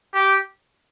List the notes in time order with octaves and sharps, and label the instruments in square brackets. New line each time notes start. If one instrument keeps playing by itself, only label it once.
[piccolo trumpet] G4